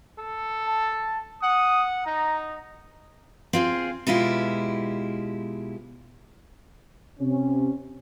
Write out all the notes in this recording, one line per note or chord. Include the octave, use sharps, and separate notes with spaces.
A4
A5
F#5 D#6
D#4 A#5
C4 F4 G#4
B2 G#3 E4 F4 G4
C3 C#4